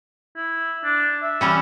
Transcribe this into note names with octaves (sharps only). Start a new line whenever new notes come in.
E4
D4
E5
E3 G3 C#4